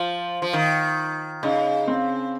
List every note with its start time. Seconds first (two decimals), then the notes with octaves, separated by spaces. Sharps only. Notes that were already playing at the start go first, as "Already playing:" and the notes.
Already playing: F3 F4
0.42 F3
0.53 D#3
1.43 C#3 D#4
1.88 C4